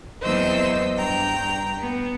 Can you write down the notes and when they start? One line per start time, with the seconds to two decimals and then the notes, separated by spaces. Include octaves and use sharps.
0.23 E2 F#3 C4 C5 D#5 E6
0.98 G2 G5 A#5
1.77 B3